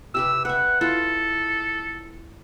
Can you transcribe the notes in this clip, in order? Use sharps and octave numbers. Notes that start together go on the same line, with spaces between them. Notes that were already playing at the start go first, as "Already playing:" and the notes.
C3 G4 B4 E6
B4 E5 F#5
E4 F4 A4